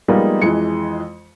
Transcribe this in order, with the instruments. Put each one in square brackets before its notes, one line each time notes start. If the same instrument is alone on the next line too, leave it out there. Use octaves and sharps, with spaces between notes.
[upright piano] F3 G3 G#3 A#3 B3 D#4
F2 E3 G#3 C#7